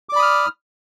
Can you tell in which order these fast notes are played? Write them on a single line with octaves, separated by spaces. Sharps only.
D6 D5 B5 D#6 F6